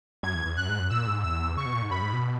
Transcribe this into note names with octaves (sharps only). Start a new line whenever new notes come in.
F#2 G#6
E2
E2
F#2 F#6
G#2
F#2
A#2 E6
G#2
E2 E6
C#3 C#6
B2
A#2
G#2
F#2 B5
G#2
B2